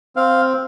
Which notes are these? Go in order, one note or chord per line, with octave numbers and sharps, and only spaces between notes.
C4 F5